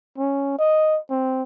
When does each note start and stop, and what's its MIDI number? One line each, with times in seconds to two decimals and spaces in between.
0.18 0.55 61
0.58 0.99 75
1.10 1.43 60